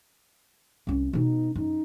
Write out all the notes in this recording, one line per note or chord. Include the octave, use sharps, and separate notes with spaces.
C2 C#4
B2 B3 D#4
F#2 D#4